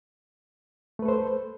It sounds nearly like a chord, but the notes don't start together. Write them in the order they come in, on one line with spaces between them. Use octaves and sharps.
A3 B4 A4 C5